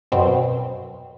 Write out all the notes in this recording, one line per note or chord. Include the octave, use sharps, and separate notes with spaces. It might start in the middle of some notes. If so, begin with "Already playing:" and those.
F#2 B2 C4